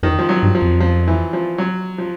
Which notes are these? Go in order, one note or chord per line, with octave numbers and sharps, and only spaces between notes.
F2 D#3
F3
F#3
G2
F3
F2
F3
E3
F3
F#3
F3